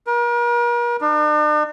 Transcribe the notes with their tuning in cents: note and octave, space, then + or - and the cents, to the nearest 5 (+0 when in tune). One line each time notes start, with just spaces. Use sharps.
A#4 +40
D4 +45